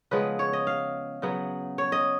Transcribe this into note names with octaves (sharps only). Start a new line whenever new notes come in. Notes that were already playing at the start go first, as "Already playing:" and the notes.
C#3 F3 G#3 B3 B4
C#5
D#5
F5
C#3 F#3 B3
C#5
D#5